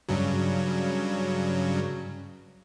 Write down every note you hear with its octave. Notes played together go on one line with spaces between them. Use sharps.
G2 C#3 F#3